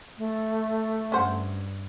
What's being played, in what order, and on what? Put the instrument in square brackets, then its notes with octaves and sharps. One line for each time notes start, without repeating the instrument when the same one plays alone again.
[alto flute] A3
[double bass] G2 [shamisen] C#4 C5 F#5